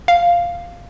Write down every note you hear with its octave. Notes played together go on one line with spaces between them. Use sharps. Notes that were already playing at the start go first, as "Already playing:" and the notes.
F5